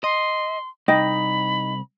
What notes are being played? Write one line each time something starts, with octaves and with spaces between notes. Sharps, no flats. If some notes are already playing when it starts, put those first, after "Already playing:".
D#5 C6
C2 D#4 D#5 G5 B5